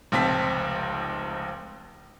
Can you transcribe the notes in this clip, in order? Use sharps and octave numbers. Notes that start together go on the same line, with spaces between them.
F1 C#2 C4 A5 B6